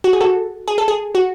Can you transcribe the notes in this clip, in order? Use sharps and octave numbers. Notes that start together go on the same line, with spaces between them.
F#4
G#4
F#4 A4
G#4
A4
G#4
F#4